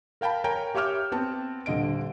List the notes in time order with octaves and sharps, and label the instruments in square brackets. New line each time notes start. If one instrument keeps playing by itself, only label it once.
[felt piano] A#4 F5 G5 A5 B5
A#4 C#5 G5 G#5 A#5
G4 C#5 E5 D6 F6 G6
B3 C4 A5
D#1 D3 D#5 D7